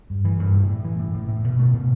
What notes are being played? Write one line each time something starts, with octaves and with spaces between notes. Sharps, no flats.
G2
E3
G2
A2
A2
E3
A2
A2
A2
B2
A3
B2